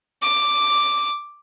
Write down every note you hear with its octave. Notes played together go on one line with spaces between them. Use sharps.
D6